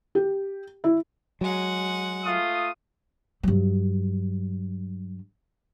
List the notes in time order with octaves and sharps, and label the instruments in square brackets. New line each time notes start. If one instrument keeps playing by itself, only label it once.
[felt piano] G4
E4
[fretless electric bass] F#3 [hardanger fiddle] G#3 F#5
[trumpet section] A3 F4 D#6
[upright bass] G2 F#3